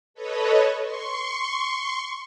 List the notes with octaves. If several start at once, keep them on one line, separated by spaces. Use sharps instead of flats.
A4 B4 C#5 D#5
C6 C#6